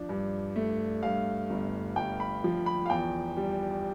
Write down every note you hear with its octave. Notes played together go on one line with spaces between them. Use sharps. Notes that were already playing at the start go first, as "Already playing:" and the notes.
Already playing: F3 D4
G2
A3
G2 F5
G1
G1 G5
B5
F3
B5
F5
E2 G5
G3